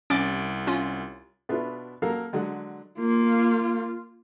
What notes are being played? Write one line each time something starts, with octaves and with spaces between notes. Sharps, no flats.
C2 C#4 D6 A6 D7
C#4 F4
B2 B3 D4 E4 F4
F#3 A#3 A4 A#4 F5
D3 F#3 G#3
A#3 F4